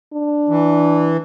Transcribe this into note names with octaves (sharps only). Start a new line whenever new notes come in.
D4
E3